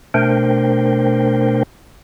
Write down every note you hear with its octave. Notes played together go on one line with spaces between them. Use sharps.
B2 A3 D4 A#4 C5 G5